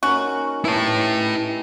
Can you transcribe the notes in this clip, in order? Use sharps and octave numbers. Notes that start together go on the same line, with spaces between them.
C#4 D#4 F#4 A#4
E4 G4 B4 A5